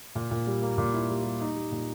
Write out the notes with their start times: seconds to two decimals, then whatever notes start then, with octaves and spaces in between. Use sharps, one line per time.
0.15 A#2
0.31 A#2
0.47 G3
0.62 A#3
0.78 A#2
0.94 E4
1.10 G3
1.25 G3
1.41 D#4
1.56 G3
1.72 A#2